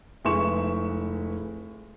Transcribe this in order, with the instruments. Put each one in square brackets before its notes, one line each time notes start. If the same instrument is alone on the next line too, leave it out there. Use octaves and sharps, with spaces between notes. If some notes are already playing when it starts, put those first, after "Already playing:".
[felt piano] F1 G#3 E4 B4 C#6 E7